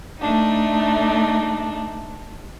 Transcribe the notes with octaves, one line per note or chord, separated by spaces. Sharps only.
A3 D4 D#4